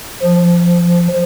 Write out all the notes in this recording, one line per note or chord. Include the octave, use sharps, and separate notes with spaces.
F3